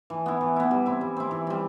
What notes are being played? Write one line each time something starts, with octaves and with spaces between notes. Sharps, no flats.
E3
B3 E4
E3
B3 E4
G3
C4 E4
G3
C4 E4
E3
G3 C4